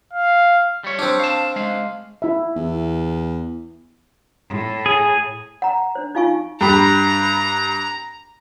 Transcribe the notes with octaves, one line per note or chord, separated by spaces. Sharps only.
F5
G3 C#5
C4 D4
F5 A5
G#3 F5
E4 E5
E2
A2
G#4
F#5 A#5
D4 C5
D#4 F4 F5 G#5 C#6
G2 G4 A#5 B5